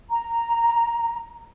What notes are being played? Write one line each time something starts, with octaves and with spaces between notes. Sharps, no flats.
A#5